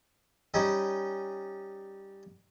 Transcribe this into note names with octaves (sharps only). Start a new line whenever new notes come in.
G3 C#4 D#4